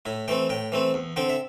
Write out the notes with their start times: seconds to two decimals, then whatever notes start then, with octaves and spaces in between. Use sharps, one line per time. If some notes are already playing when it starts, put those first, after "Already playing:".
0.05 A2 E4
0.28 E3 A3 C4 G5
0.49 A2 G5
0.72 E3 A3 C4
0.94 E2
1.16 D3 C4 G5
1.29 E5